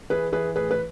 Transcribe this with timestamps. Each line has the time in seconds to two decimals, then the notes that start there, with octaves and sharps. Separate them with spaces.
0.10 E3 G#4 B4
0.33 E3 G#4 B4
0.56 A2 G#4 B4
0.71 B4